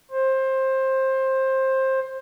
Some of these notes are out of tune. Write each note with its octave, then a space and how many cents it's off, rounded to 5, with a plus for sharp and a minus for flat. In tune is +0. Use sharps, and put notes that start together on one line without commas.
C5 +20